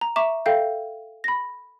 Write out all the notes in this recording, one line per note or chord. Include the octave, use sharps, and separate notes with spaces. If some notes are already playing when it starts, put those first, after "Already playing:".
A#5
E5 A#5 C#6 D6 E7
A4 E5 F5 G5 G6
B5 A#6